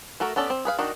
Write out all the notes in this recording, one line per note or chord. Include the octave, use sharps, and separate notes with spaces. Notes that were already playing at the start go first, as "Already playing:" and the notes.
A3 F#4 A4 A#4
B3 C#4 A4 D5
C4
G#4 B4 F5
D#3 D4 D#4 F#4